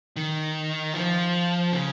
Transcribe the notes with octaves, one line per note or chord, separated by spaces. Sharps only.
D#3
F3
C#3